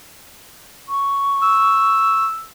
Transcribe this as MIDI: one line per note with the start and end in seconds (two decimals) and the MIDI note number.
0.89 2.25 85
1.43 2.45 88